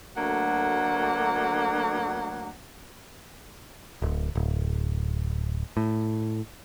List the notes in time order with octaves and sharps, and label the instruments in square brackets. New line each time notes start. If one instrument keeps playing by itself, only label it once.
[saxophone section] D2 F#3 A3 A#3 D4 F#5
[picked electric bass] D1
D1
A2